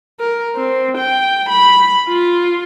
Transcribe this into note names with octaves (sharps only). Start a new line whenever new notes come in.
A#4
C4
G5
B5
F4